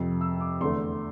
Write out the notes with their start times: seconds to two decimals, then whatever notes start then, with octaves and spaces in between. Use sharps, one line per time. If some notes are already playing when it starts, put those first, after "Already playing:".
Already playing: F2 C3 F3
0.21 E6
0.40 D6
0.60 E2 D3 A3 C6